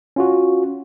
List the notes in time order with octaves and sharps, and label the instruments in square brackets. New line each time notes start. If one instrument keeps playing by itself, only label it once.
[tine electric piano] C#4 F4 F#4